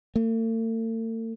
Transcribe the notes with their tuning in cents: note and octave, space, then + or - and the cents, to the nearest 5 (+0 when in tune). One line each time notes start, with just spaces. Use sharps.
A3 +45